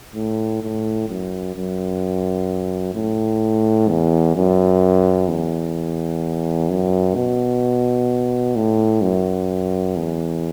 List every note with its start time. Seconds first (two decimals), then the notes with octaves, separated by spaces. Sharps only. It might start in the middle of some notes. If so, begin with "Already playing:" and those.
0.15 A2
0.62 A2
1.09 F#2
1.56 F#2
2.95 A2
3.89 E2
4.36 F#2
5.28 E2
6.69 F#2
7.16 B2
8.56 A2
9.02 F#2
9.96 E2